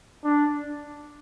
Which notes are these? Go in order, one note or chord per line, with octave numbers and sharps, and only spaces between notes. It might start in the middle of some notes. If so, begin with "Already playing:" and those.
D4